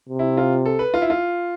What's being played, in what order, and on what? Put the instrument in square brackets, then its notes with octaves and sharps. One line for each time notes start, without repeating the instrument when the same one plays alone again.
[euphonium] C3
[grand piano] E4
F4
A4
B4
F4
E4
F4